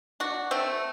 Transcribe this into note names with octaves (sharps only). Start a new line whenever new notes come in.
D4 F#4
A3 C4